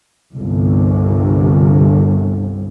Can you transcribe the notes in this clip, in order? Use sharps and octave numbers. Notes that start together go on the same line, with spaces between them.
G1 C2